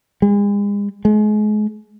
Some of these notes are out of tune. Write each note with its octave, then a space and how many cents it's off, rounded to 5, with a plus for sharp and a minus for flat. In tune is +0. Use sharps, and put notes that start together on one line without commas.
G#3 -40
G#3 +35